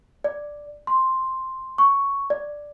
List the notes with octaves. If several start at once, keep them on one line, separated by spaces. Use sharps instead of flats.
D5
C6
C#6
D5